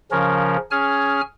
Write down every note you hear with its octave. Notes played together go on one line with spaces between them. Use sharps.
C#3 F3 C#4 A#4
C#4 G#4 G#5 F6